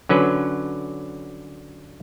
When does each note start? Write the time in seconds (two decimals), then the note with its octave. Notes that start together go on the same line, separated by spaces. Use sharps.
0.09 D3 F#3 C#4 B4